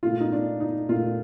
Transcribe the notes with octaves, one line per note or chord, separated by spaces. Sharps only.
A#2 A3 F4
D#4
D4
D#4
A#2 A3 F4